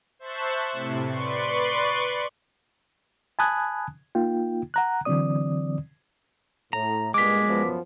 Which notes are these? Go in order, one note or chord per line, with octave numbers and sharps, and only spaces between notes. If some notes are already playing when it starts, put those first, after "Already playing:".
C5 E5 A5 C#6 F#6
A2 C3
B4 D5 C6 C#6
G#5 A5 B5 D#6 F#6 G#6
A#3 D#4 F4 G5
F#5 A#5 F#6
D3 E3 F#3 C4 D5 D#6
A2 A#5
G2 A#2 G#3 B3 D6 B6
F#2 F3 B3